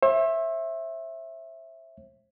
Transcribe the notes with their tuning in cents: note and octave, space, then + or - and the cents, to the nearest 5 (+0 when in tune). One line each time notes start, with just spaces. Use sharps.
C5 +45 E5 +0